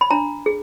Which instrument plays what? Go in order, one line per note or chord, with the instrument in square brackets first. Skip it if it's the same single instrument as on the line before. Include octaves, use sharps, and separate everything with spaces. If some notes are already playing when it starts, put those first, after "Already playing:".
[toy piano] B5
D4 A#5
G#4